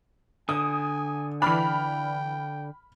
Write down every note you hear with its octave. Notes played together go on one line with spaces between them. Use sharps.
D3 G#5 D#6
E3 D4 G5 B5 F6